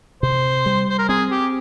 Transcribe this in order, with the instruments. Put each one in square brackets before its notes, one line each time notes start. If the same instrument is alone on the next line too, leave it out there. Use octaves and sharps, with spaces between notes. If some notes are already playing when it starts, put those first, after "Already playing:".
[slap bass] C3 [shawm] C5
[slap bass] G3
[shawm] C5
A#4
[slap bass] C4 [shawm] G#4
[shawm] G4